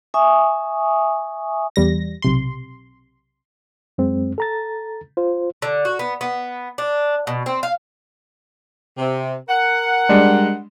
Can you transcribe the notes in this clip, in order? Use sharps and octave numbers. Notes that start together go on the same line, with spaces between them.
E5 G#5 C#6 D#6
E2 G3 A#6
B1 C3 C6
F#2 G#3 C4
A4 A#5 A6
F4 C5
D3
F#4
B3
B3
D4
B2
C4
F5
C3
A#4 F#5
G3 G#3 D4